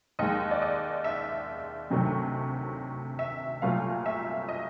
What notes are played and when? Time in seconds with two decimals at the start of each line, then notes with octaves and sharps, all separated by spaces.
0.19 D#2 D#3 G#3 D#5
0.51 D5
0.62 D#5
1.04 E5
1.90 D2 C3 D#3 F#3 A3
3.19 E5
3.62 C2 A#2 F#3 A3 F5
4.06 E5
4.49 D#5